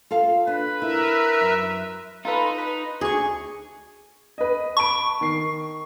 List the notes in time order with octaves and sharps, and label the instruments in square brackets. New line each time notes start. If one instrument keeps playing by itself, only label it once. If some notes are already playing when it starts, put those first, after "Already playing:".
[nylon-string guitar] F4 A4 F5
[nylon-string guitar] D4 [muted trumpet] B4
[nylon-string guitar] E4 [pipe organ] A#4 E5
[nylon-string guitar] F#2
[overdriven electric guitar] D#4 [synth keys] F4 A4 B4
[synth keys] B4
[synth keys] D2 D4 C#6 [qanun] G#4
[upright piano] B4 D#5
[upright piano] A5 B5 D7 [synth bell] C#6
[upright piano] D#3 C7